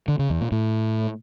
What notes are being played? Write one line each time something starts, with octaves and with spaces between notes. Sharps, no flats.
D3
C#3
E2
A#2
A2